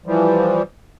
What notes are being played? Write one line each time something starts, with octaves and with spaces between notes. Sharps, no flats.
E3 F3 G3